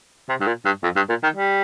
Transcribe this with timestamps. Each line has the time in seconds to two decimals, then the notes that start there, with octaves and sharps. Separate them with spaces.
0.29 C3
0.40 G2
0.47 A#2
0.65 G2
0.83 F2
0.96 G2
1.09 A#2
1.23 D#3
1.36 G3